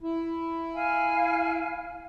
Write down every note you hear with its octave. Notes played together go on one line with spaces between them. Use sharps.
E4
F5 G#5